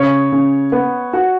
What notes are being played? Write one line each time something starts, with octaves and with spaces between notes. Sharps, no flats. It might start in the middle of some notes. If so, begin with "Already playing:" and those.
Already playing: C#3 C#5
C#3
B3
F#4